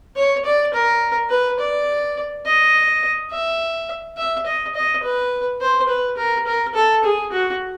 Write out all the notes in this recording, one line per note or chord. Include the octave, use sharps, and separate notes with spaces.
C#5
D5
A#4
B4
D5
D#5
E5
E5
D#5
D#5
B4
C5
B4
A#4
A#4
A4
G#4
F#4